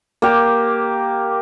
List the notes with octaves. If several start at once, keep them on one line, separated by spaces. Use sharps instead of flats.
A#3 G4